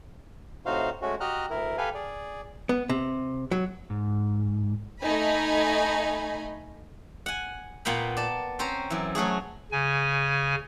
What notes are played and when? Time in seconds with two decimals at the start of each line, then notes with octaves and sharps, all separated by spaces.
0.66 A2 C3 D#4 F#4 C5 F5
1.02 G#3 A3 C#4 F#4
1.20 F#4 G4 D#5 A#5 F6 F#6
1.50 D2 E4 A#4
1.78 G4 A4 B4 F5 G#5
1.94 G#4 D5
2.69 B3
2.89 C3
3.51 F#3
3.90 G#2
5.02 A3 D#4 D#5 G#5 B5
7.26 F#5 G#5
7.85 A#2 B3 F5 G5 B5
8.17 D5 A5
8.59 C4 C#4 C5 A#5
8.90 F#2 E3
9.15 F#3 A3 F#4 G#4
9.72 C#3 G#5